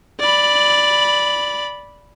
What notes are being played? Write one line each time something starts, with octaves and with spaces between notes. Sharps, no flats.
D5 B5